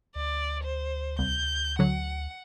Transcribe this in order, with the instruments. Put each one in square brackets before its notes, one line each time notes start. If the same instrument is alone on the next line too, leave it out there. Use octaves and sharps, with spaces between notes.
[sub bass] D2 [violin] D5
[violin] C5
[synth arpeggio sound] C2 [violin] G6
[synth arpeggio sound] D3 F#3 [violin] F#5